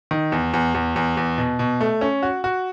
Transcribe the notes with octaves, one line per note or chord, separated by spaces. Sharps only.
D#3
E2
E2
E2
E2
E2
B2
B2
A3
C#4
F#4
F#4